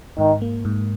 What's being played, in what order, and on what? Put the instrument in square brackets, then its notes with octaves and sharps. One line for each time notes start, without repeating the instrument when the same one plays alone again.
[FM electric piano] G#2 [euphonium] D#3
[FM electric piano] A#3
G#2